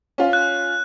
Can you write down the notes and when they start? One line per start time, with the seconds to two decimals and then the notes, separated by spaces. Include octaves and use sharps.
0.18 C#4 F4
0.33 F#6